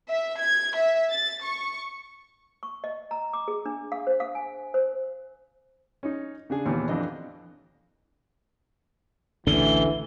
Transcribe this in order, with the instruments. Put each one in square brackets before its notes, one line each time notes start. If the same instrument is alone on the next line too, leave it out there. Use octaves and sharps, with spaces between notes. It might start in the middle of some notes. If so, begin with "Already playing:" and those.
[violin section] E5
G#6
E5
A6
C#6
[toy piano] C#6
D#5
A#5
D6
G#4
D4
F5
C5
F5
G#5
C5
[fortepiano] C#4 D#4
C#3 D4 G#4
D#2 A#2 E3 B3
F2 E3 D4 D#5
[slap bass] A1 D2 A2 [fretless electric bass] D3 [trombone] E3 [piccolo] G7